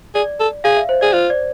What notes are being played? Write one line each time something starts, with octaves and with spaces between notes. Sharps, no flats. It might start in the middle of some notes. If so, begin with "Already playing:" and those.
G#4 D5
A4
G#4 F5
E5
C5
G#4 D5
F4 C5
D5